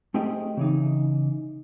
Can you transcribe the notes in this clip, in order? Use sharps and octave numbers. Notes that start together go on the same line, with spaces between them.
A3 C4 G4 G#4 D#5 G5
C#3 E3 D#4